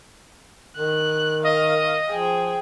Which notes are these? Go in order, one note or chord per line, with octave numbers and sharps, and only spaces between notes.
D#3 F#6
D#5 F5
F3 G#4 G5